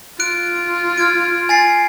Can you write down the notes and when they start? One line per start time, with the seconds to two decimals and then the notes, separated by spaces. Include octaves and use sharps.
0.20 F4 F#6 D7
0.98 F6 G#6 D7
1.49 G#5 A6 C7